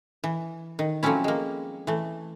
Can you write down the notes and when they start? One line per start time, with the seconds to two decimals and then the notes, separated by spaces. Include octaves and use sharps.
0.24 E3
0.79 D#3
1.03 F3 F#3 A3 C4 C#4 E4
1.24 G#3 A#3
1.87 E3 A3